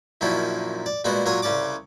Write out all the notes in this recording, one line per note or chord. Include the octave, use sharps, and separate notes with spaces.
F#2 A#2 D#3 F3 C#4 E4
D5
A#2 G3 G#3 B3 F#4
A#2 F#3 A#4 C#5 G#5
C2 C#3 C#4 D5 D6